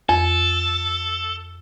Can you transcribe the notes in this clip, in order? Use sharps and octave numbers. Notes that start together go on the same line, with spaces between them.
F2 A4